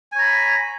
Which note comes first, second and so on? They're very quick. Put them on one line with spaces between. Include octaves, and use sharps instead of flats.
G#5 C#5 A#5 B5